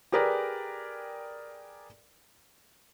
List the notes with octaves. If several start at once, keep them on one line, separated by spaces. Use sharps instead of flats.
G4 G#4 A#4 B4 D5 G5